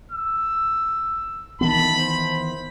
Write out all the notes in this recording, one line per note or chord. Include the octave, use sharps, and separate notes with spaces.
E6
D#3 E3 B3 A5 B5
C5